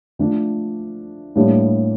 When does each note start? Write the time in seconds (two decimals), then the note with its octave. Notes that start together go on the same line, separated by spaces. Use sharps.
0.19 D3 F3 A3 D4
1.35 A2 G3 A#3 D4